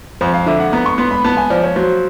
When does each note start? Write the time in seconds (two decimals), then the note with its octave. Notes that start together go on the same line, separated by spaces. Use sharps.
0.21 F2 C5
0.34 F5
0.46 D3 E5
0.60 F#5
0.73 B3 A#5
0.86 C#6
0.98 B3 C6
1.11 B5
1.24 B3 A5
1.37 G#5
1.50 F3 D5
1.63 C#5
1.76 F#3 C5